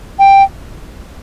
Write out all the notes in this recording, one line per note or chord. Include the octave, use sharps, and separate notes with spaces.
G5